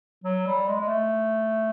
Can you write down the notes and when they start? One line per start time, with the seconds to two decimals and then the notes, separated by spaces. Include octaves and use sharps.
0.24 F#3
0.47 G3
0.68 G#3
0.81 G#3
0.88 A3